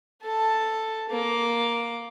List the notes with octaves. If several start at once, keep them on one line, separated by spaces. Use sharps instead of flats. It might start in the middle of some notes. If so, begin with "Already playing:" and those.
A4 A5
A#3 D6